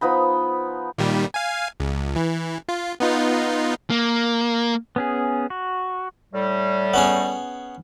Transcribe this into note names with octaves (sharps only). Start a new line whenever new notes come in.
F3 B3 D#4 B5
A#2 D#3 G3
F5 G#5
C#2
E3
F4
B3 D#4 F4
A#3
B3 C#4 G#4
F#4
A2 G3
B3 C#4 G#4